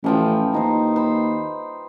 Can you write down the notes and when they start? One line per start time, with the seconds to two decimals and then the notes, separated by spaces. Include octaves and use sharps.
0.04 A1 E3 F3 G5
0.52 D#2 A#3 D#4 C5
0.96 C5 B5